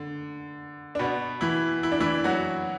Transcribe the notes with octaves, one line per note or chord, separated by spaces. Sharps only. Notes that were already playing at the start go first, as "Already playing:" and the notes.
Already playing: D3
D4
B2 B3
E3 E4
E4
D4
E3 E4
F#3 F#4